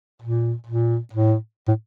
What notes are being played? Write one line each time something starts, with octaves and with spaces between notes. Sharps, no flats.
A#2
A#2
A2
A2